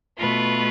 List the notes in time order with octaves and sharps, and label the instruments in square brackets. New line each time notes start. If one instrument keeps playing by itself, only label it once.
[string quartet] B2 A3 F4 B4